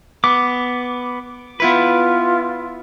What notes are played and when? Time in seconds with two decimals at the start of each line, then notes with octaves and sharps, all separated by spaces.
0.24 B3 D6
1.60 B3 E4 F4 B4